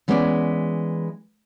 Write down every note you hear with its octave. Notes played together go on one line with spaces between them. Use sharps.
E3 G#3 B3 C#4 C#5 D5